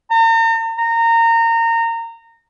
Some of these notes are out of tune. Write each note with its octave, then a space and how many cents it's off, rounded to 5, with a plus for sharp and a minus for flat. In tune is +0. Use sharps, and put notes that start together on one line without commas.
A#5 -40
A#5 -25